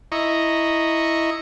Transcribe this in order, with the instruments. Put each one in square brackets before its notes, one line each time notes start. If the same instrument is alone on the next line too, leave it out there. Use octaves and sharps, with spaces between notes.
[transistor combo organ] E4 D#5 A#5 C#6